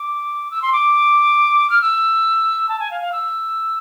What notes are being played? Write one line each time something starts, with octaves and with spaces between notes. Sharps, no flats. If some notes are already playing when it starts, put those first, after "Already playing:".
Already playing: D6
E6
C6
D6
F6
E6
A5
G#5
F5
F5
E6